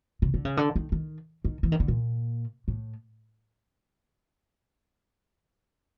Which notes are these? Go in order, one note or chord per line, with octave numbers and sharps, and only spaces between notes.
C#3
D3
C#3
D3
D#3
D#3
D#3
E3
D#3
D3
A#2
A2